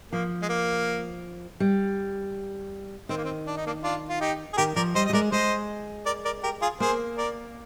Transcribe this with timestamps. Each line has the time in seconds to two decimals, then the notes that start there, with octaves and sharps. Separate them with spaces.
0.12 F3 A#3
0.42 G#3
0.49 A#3
1.60 G3
3.09 D#3 C4
3.17 A#3
3.24 C4
3.47 D4
3.57 D#4
3.66 A#3 D4
3.83 D4 F4
4.09 F4
4.21 D#4 G4
4.53 G#4
4.57 D#3 G4 A#4
4.76 F3 A#4 D5
4.95 G3 C5 D#5
5.06 D#5
5.10 G3
5.13 G#3 A#4 D5
5.32 G#3 C5 D#5
6.06 A#4 D5
6.25 A#4 D5
6.43 G4 A#4
6.62 F4 G#4
6.80 A#3 G#4 C5
7.17 A#4 D5